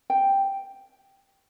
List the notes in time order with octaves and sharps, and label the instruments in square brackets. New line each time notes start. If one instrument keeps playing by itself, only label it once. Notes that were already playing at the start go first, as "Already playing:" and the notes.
[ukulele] G5